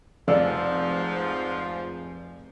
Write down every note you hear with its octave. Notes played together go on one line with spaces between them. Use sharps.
F1 G#2 F3 D5 E6